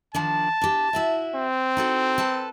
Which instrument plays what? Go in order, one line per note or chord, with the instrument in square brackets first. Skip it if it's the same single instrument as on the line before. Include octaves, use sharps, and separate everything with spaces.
[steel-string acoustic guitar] D#3 F3 D4 [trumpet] A5
[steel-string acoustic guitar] D4 G4
E4 F#4 E5
[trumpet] C4
[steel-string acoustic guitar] D#4 F#4 A4
A4 B4 A5